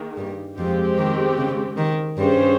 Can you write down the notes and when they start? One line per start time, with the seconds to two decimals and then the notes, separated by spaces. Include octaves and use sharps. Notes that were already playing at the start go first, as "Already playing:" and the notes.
Already playing: D#3 A#3 G#4
0.17 G2 G3
0.58 F2 F3 G#3 C4 G4
0.98 D#3
1.37 C#3
1.77 D#3
2.18 G2 G3 C#4 G#4 C5